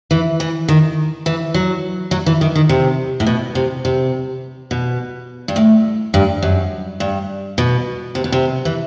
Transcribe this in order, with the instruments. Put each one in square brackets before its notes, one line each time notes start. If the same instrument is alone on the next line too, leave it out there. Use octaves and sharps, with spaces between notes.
[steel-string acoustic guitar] E3
E3
D#3
E3
F#3
F#3
E3
D#3
D#3
C3
A2
B2
C3
C3
B2
G2
A2
G2
F#2
G2
B2
C3
B2
C3
E3